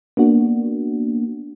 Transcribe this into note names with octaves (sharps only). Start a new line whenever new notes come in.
A#3 B3 D4 F#4